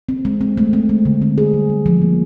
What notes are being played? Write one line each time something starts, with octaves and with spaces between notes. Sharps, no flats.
C4
G#3
C4
A3
C4
G#3
D3
C4
G#4
G3
G3
F3
A#3